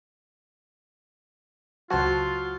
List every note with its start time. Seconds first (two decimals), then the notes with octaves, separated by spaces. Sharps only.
1.91 C#2 F#3 F4 F#4 C5 A5 C6